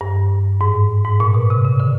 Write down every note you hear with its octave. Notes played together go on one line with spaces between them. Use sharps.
G2
G#2
G#2
A#2
B2
C3
C#3
D3